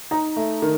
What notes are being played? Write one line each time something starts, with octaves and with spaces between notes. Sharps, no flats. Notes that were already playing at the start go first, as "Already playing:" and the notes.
D#4 A#5
A3
D#3